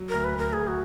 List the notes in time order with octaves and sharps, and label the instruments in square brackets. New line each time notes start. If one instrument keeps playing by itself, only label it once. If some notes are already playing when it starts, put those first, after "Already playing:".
Already playing: [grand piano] F#3
[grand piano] D2 [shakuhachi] A#4
[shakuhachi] B4
[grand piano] D2 [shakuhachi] A#4
[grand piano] D2 [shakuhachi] G#4
[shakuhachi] F#4